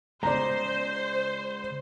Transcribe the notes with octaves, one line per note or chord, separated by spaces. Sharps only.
C#3 G#3 C5 D5 A#5